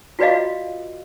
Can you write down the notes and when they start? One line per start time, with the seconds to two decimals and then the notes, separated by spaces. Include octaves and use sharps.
0.19 F4 F#4 B4 D5 D#5 F5